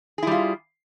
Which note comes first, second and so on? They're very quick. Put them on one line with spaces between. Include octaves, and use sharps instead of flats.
G#4 E4 G3 F4